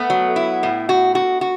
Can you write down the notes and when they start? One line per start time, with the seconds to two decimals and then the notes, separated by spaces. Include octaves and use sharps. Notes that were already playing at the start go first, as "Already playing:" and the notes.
Already playing: A3 B3
0.10 F#3
0.36 E4
0.63 A2
0.89 F#4
1.15 F#4
1.41 F#4